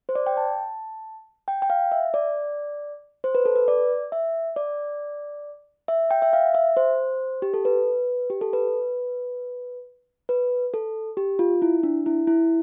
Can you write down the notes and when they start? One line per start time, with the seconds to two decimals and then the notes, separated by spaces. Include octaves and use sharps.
0.09 C5
0.15 D5
0.27 G5
0.37 A5
1.48 G5
1.62 G5
1.70 F5
1.92 E5
2.14 D5
3.24 C5
3.35 B4
3.45 A4
3.56 B4
3.68 D5
4.12 E5
4.56 D5
5.88 E5
6.11 G5
6.22 E5
6.33 F5
6.55 E5
6.77 C5
7.42 G4
7.54 A4
7.65 B4
8.30 G4
8.41 A4
8.53 B4
10.29 B4
10.74 A4
11.17 G4
11.39 F4
11.62 E4
11.83 D4
12.06 E4
12.27 E4